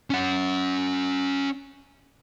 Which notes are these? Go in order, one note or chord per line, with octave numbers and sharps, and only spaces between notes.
C#4 F#5